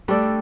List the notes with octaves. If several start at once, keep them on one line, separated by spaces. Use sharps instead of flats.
G3 A3 D4 A4 D5